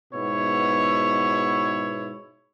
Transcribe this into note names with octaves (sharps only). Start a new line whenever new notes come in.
G#2 B2 B3 E4 C#5